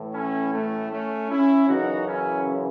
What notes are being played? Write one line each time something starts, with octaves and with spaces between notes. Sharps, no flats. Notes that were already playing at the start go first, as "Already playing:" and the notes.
Already playing: A2 E3
C#4 E4
A3 C#4
A3 C#4
C#4 E4
F#2 C#3 E3 D#4 F#4
C#4 E4